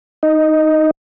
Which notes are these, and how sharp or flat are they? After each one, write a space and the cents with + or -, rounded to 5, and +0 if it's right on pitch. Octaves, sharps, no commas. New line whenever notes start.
D#4 +0 D#5 +0